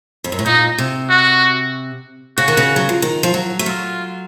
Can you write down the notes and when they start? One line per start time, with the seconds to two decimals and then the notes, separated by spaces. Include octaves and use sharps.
0.24 F2
0.32 F#2
0.39 A2
0.46 A#2 D#4
0.78 C3
1.10 F#4
2.37 C#3 F#4
2.48 D#3
2.57 C#3
2.76 F#3
2.89 F3
3.02 D#3
3.23 F3
3.34 F#3
3.59 A3
3.66 F#3 F4